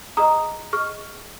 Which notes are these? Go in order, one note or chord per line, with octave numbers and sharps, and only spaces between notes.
G#4 D#5 A#5 D#6
G#4 D#5 C#6 F6